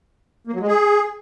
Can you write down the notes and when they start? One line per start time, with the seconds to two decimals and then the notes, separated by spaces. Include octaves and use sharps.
0.47 A#3
0.54 F#3
0.61 G#3
0.67 G#4